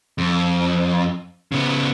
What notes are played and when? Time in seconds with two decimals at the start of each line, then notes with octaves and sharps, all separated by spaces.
0.18 F2
1.52 C#3 B3